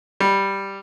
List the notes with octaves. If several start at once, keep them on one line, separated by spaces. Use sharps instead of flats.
G3